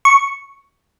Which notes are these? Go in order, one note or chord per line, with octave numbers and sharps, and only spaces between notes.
C#6